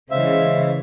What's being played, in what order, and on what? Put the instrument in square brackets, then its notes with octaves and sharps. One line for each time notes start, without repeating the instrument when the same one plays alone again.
[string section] C#3 E3 [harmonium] G#3 C5 F5 [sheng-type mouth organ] E5